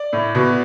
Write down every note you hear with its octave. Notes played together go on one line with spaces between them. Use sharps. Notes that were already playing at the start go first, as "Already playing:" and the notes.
Already playing: D5
A2
B2